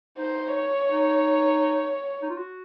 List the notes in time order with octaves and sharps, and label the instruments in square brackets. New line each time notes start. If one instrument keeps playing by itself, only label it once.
[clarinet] D#4 [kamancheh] C5
[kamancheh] C#5
[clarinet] D#4
D#4
F4
F#4